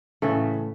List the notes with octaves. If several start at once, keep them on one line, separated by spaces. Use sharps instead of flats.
A2 C#3 E3 A3